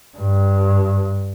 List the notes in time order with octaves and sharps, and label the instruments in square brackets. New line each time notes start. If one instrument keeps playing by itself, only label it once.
[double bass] G2